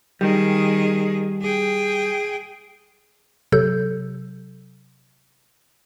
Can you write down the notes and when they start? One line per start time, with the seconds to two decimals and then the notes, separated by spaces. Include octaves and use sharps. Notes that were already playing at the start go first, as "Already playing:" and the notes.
0.21 D#3 G3 G#4
1.42 G#4 G5
3.52 C3 F#3 A4 G6